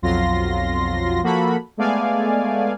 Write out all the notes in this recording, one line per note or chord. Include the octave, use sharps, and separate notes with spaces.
B1 F2 F#3 F4 C6 A#6
F3 A#3 F#4 A4 B5
G#3 A3 B3 D5 F5 G#5